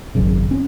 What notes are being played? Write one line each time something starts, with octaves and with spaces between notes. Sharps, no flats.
G#1 F#2 C#3
C#4